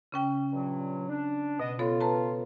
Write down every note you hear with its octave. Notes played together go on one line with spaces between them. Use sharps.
C#3 C#4 G5
G2 A#2 F#3
D4
B2 B3 D4 D#5
B3 F4 A4 C#5
B4 A5 A#5